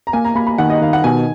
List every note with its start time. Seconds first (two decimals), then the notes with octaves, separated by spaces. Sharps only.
0.07 A#5
0.13 A#3 G#5
0.25 A#5
0.35 A#3 B5
0.47 B5
0.58 D#3 F#5
0.70 D#5
0.81 D#3 F5
0.93 F#5
1.04 B2 G#5